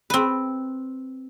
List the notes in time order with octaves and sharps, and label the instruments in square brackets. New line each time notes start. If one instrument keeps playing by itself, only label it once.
[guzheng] C4 B4